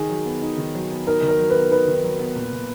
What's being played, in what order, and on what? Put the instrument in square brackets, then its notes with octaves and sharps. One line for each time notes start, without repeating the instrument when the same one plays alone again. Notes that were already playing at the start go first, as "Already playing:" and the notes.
Already playing: [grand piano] D#3 D#4 [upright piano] G#4
[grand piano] F#3
B3
D#4
D#3
F#3
B3
[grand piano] D#4 [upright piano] A#4
[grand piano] D#3
[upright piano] A#4
[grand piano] F#3
[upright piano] B4
[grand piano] B3
[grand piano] D#4 [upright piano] B4
[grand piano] D#3
F#3
B3
A#2
A#2